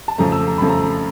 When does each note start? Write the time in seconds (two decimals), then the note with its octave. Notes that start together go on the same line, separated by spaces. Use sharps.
0.08 A5
0.18 F2 C#3 F3 A3 A#5
0.32 E6
0.47 A#5
0.58 F2 C#3 F3 A3 B5
0.69 A#5